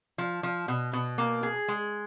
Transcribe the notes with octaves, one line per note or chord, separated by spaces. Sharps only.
F3
F3
B2
B2
A#3
G#4
G#3